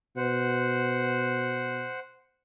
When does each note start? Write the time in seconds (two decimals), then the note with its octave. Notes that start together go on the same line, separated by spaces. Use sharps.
0.17 B2 C5 F#5